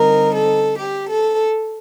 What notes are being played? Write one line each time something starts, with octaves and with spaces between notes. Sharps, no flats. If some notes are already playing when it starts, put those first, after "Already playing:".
Already playing: D3 G3 C4 D#4 A#4
A4
G4
A4